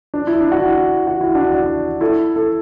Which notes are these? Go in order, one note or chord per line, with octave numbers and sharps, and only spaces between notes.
D4
E4
D4
F#4
E4
F#4
E4
D4 F#4
D4 F#4
E4 A4
A4